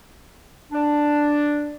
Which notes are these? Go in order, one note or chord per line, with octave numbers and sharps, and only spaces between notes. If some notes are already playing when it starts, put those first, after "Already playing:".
D4